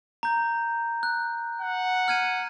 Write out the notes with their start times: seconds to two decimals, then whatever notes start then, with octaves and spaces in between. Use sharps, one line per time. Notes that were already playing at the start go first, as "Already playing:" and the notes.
0.23 A#5 G6
1.03 F#6
1.61 F#5
2.08 F6 G#6 D#7